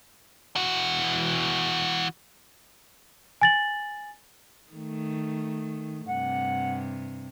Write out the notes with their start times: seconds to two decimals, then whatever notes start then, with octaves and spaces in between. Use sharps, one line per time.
0.56 E3 F#4
3.42 G#5 A6 F#7
4.73 D#3 A3
6.08 G2 C3 F#5